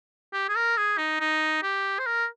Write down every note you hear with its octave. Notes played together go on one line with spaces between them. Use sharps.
G4
G#4
A#4
G#4
D#4
D#4
G4
C5
A#4